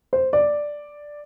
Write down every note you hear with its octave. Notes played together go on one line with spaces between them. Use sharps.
C5
D5